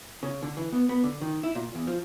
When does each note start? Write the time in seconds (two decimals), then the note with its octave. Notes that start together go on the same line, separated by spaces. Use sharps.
0.23 C#3
0.42 D3
0.57 E3
0.72 B3
0.89 B3
1.03 D3
1.21 D#3
1.43 E4
1.55 A#2
1.74 E2
1.87 F3